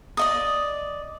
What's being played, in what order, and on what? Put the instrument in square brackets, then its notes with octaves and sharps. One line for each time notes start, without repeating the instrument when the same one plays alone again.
[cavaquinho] D5 D#5 D#6